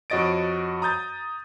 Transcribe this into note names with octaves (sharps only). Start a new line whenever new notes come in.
F2 F#4 C#5 D#5 A6 D7
A#5 D#6 G6 A6